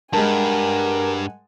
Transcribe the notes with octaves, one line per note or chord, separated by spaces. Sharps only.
G2 G#3 A#4 F#5 G#5 A5